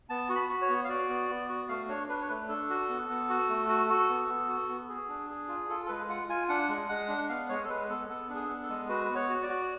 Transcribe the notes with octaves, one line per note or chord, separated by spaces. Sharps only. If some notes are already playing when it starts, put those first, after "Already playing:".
B3 A5
F#4
B5
F#4
C#5
B3
F5
F#4 D5
B3
B3
F#4
A3 F5
D4 C#5
D4 B4
C#5
A3 B4
D4 A4
F#4
B3
B3
F#4
A3
F#4
F#4
B3
B3
F#4
B3
G#4
D4
G#4
F4
F4 A4
A4
G#3 B4
F4 F#5
F4 G#5
D4 F#5
G#3
G#3 F#5
D4
B3 F5
G#3 C#5
A4
G#3 B4
B3 A4
B3 A4
D4
G#4
B3
A4
G#3
F#4 B4
B3 B4
C#5
F#4
D5
F#4